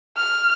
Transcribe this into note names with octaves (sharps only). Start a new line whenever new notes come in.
F6